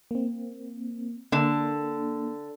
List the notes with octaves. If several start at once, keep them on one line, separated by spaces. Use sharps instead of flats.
A#3 C4
D3 A#3 D4